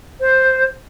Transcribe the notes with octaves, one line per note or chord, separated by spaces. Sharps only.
C5